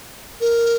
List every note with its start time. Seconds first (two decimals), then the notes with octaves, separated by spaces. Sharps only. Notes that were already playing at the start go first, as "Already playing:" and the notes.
0.41 A#4